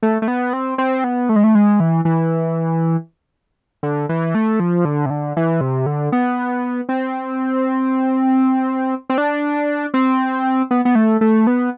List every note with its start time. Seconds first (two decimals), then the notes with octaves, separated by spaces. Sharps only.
0.03 A3
0.22 A3
0.28 B3
0.53 C4
0.78 C4
1.04 B3
1.29 A3
1.36 G#3
1.44 A3
1.55 G#3
1.80 E3
2.05 E3
3.83 D3
4.09 E3
4.35 A3
4.60 F3
4.85 D3
5.06 C3
5.10 D3
5.37 E3
5.61 C3
5.86 D3
6.12 B3
6.89 C4
9.09 C4
9.18 D4
9.94 C4
10.71 B3
10.85 B3
10.95 A3
11.21 A3
11.47 B3